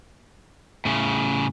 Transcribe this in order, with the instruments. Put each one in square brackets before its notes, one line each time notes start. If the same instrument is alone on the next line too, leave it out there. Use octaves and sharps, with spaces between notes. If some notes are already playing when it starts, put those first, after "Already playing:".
[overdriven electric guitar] A2 C#3